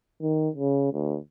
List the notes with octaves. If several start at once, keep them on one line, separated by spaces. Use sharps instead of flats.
D#3
C#3
D2